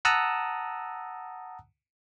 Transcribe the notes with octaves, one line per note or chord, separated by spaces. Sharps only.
F#5 A5 A#5 D#6 E6 F#6